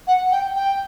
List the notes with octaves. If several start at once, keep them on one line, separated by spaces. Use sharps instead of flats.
F#5
G5
G5